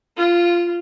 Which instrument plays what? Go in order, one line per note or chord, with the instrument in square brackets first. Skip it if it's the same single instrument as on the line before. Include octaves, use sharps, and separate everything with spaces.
[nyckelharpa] F4